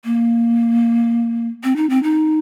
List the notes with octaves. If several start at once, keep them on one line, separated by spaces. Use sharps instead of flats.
A#3
C4
D#4
C4
D#4